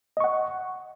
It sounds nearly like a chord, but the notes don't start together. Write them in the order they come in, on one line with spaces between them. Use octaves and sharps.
D#5 C#6 F#5